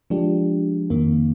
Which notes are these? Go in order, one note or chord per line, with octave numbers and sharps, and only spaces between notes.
F3 G#3 D4 G4
F2 D#3 A#3